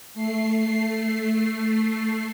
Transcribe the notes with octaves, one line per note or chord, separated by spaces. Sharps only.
A3 C7